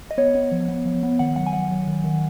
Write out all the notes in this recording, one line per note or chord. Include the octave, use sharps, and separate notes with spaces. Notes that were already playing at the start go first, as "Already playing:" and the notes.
D#5
B3 C#5
B3
F3
B3
F3
B3
D#3 F#5
F#3 F#5
G#5
F#3 F#5
F#3
D#3
D#3